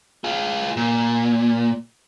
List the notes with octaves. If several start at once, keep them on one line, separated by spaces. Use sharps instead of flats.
F4 G#4
A#2